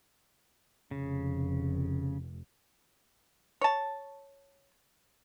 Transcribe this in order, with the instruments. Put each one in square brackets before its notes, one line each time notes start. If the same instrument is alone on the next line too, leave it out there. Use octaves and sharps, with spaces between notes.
[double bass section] F1 [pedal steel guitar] C#3
[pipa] C#5 A5